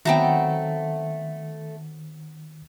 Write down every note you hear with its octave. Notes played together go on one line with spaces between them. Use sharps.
D#3 F#3 A3 B3 C4 G5 A5 A#5